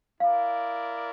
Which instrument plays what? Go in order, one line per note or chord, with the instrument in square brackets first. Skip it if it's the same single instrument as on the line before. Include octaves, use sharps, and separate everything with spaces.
[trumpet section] E4 A#4 D5 [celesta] F5